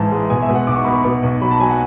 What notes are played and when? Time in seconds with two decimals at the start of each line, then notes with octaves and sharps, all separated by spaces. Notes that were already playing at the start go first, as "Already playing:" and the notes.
Already playing: A1 G#2 E3 A5
0.12 G#3
0.30 B2 G#5
0.42 E5
0.49 B2
0.55 F#5
0.67 B1 D6
0.76 C#6
0.84 B2 B5
0.93 C#6
1.04 B2
1.23 B1
1.41 F#3 B5
1.51 A5
1.60 F#3 G#5
1.69 F#5